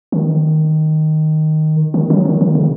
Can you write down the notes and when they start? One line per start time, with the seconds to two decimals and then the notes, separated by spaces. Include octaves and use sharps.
0.12 D#3
1.94 D#3
2.10 F#3
2.25 D#3
2.41 D#3
2.55 C#3